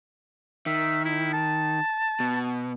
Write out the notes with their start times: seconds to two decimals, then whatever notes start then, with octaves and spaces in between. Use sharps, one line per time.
0.66 D#3 E5
1.05 E4
1.33 A5
2.20 B2